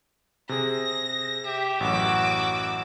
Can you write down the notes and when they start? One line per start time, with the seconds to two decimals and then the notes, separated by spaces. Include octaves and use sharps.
0.49 C3 G#4 A#6
1.45 G4 E5
1.80 A1 F#2 F#4 D6 E6